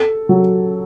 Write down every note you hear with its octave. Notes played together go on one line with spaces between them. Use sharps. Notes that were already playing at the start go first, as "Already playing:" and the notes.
Already playing: A4
F#3